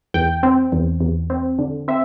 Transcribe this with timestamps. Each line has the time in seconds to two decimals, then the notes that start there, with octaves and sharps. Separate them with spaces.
0.14 E2 G5
0.43 C4
0.72 E2
1.01 E2
1.30 C4
1.59 D3
1.88 C4 E5